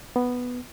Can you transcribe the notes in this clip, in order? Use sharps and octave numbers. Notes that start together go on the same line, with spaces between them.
B3